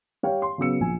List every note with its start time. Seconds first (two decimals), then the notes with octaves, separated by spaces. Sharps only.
0.23 G3 C#5 F5 G5
0.42 C6
0.58 C#3 F#3 B3 E6 C#7
0.80 A#1 G#5